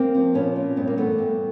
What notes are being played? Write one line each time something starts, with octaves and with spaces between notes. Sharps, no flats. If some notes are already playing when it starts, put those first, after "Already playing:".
Already playing: A#3 C4
F3
A#2 B3 C#4
A#2
G2 B3
A#3
E3 A3 B3
G2